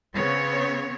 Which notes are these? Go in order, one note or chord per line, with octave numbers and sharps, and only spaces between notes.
C#3 B3 C4 C#5